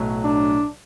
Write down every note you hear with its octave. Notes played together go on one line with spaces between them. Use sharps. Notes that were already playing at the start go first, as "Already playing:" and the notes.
Already playing: B1 A2 F#3
D4